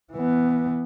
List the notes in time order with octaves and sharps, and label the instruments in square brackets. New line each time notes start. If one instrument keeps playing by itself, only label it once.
[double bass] E3 B3